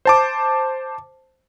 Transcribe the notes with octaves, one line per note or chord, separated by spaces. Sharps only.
C5 A5 D6